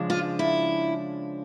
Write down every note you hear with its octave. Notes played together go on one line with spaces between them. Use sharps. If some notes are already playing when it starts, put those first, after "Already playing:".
Already playing: C#3 F3 G#3 D4
F4
E4